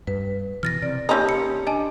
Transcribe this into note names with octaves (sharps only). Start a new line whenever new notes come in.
G2 B4
B2 E3 F6 A6 A#6
C3 D5
A#3 C#4 D#4 G4 A5 B5 C6 E6
C#7
D4 D#5 G#5 A5